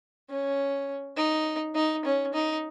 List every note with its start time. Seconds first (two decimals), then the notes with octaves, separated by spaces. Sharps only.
0.30 C#4
1.17 D#4
1.75 D#4
2.05 C#4
2.34 D#4